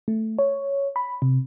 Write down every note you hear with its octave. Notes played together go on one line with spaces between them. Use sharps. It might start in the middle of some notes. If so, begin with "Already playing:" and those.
A3
C#5
B5
C3